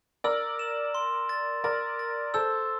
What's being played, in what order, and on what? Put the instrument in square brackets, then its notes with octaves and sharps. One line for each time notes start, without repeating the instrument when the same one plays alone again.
[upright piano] A#4 D5 [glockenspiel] E6
[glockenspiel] E7
C6
A6
[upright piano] A#4 D5 [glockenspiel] A6
[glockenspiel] A6
[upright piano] A4 C5 [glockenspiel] E6